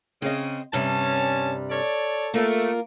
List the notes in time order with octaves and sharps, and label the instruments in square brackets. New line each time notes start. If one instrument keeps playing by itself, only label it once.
[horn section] C#3 [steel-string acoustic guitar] C4 D#5
[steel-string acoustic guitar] G2 C3 G3 [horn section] C#4 A5
[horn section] A4 C#5 D5
[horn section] A3 [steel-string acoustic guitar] A#3 F4 A#4